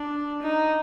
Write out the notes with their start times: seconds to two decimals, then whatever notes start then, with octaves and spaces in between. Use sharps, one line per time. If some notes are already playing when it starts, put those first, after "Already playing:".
Already playing: D4
0.42 D#4